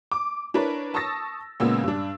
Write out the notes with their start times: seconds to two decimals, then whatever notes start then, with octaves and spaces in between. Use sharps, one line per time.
0.12 D6
0.54 D4 E4 A#4 B4 C#5
0.94 A5 C#6 D#6 E6 A6 A#6
1.60 A#2 C#3 G#3 A#3 B3 E6
1.83 G2 D4